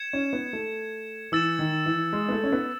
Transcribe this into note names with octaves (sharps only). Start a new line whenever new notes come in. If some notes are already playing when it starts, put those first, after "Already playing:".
Already playing: G#6 C#7 E7
C#4
B3
A3
E3 E6 A6 E7
D#3
E3
G#3
B3
A3
C#4
B3